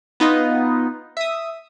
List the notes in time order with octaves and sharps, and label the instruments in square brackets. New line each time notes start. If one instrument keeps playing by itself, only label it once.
[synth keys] B3 D#4 F4 D#5
E5 D#6